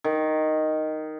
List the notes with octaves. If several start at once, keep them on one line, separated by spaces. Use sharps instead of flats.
D#3